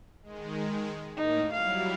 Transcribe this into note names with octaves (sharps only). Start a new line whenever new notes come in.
D#3 G#3
A2 D#3 A#3 D#4
F#3 G3 E4 F5